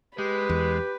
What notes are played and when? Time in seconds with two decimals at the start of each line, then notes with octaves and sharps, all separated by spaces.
0.18 G#3 G4 B4
0.49 E2